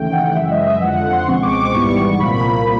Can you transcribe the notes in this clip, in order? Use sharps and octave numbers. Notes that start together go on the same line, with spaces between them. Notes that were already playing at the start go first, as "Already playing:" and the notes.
Already playing: D#2 C#3 E3 A3 G5
F#5
F#2 C#3 E3 G#3 E5
D#5
E5
F2 D3 F3 F#5
F#5
C6
C#2 B2 G#3 C4 C#6
D6
D6
G#1 G#2 E3 G3 B3 C#6
C2 A#2 F3 A#3 B5